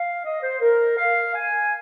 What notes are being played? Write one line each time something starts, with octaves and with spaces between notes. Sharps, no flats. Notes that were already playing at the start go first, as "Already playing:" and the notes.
Already playing: F5
D#5
C5
A#4
F5
G#5